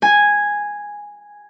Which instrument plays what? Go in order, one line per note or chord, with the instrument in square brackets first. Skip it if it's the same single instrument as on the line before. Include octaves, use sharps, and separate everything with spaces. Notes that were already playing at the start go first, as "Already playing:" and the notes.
[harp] G#5